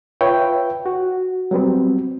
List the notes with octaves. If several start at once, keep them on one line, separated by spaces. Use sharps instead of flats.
F4 B4 C#5 E5 G5
F#4
F#3 G3 B3 C4